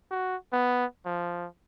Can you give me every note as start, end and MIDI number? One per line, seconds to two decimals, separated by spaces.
0.11 0.36 66
0.52 0.85 59
1.06 1.47 53